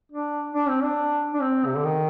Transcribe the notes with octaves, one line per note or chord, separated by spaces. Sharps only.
D4
D4
C4
D4
D4
C4
C3
D3
D#3